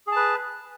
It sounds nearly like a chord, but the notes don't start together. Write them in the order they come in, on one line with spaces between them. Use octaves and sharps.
G#4 A5 B4